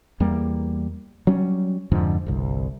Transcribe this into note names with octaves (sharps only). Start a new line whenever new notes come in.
E2 G3 A#3
F#3 G3 C#4
F2 G#2 D3 F3
G1 C2